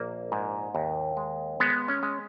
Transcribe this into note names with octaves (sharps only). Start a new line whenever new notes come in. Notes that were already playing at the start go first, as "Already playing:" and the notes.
Already playing: A#1 A#3
G#2
D#2
G#3
G#3 B3
C#4
G#3